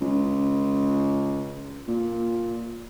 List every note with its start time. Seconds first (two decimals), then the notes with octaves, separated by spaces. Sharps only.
0.01 C#2
1.88 A#2